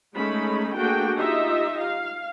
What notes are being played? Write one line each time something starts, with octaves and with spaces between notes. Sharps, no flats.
G#3 A3 C#4 D#4 B5
A3 A#3 D4 F#4 G#4 G5
D#4 F4 G4 D#5 E5
F5